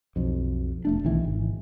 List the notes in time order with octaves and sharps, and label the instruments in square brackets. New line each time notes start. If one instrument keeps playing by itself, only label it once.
[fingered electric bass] B1 F2
E1 A3 D4
B1 D#3 E3
G#1